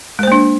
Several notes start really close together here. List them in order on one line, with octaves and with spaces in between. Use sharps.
G#3 C5 A#3 D4